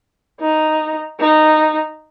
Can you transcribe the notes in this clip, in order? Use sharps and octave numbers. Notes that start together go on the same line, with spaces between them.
D#4
D#4